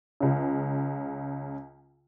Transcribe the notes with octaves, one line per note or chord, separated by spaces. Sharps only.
C#2 C#3